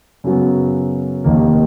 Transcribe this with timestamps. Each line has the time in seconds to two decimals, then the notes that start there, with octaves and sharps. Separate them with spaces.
0.24 F#2 C#3 F#3 B3
1.24 F1 D#2 D#3 A#3